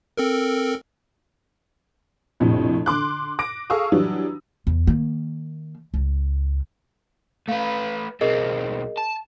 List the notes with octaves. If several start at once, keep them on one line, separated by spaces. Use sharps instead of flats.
C4 A4 A#4
A#1 F2 A2 C3
D3 C6 D6 F#6
D6 A#6 D7
G#4 A4 F5 C#6 D#6 E6
E3 F#3 G3 D4
E2
D#3 A#3
C#2
A3 B4 F5
B1 C4 G#4 A#4 D#5
A5